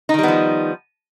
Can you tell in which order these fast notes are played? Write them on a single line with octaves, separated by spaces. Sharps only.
D#4 D#3 G3 B3 F3